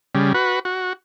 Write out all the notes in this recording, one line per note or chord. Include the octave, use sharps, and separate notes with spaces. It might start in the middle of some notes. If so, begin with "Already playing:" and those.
C#3 G3
F#4 B4
F#4